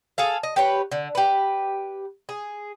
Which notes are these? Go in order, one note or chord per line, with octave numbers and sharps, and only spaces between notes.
G#4 A4 F5
D#5
G4 B4 C#5
D3
G4 B4
G#4